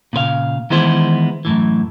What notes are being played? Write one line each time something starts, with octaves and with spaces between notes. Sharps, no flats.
A#2 C#3 B4 F5
D#3 E3 G#3 B3 E4 C5
F#2 A2 E3